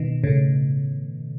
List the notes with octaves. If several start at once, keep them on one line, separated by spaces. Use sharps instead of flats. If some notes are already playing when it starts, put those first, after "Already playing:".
Already playing: B2 D#3
A2 C#3